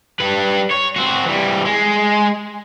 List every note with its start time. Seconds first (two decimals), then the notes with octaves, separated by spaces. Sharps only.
0.20 G3 B4
0.71 C#5
0.96 C4 F#4
1.26 E3 G3
1.65 G#3